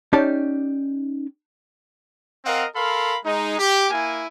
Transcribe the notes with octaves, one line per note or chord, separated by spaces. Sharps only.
C#4 D#4 G4 D5 A5
C4 A#4 D#5 F5 F#5
A4 A#4 F5 B5 C6
G#3 D#4
G4
A#3 E4 G#5